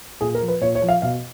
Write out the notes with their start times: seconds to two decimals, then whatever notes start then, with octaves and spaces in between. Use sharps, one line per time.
0.21 A#2 G#4
0.34 A#4
0.41 F3
0.48 B4
0.61 A#2 C#5
0.75 C#5
0.82 F3
0.88 F5
1.02 B2 F5